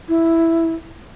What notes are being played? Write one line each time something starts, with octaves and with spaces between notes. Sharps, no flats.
E4